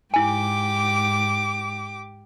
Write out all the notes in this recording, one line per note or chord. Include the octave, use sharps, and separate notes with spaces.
G#2 E4 G4 G#5 D6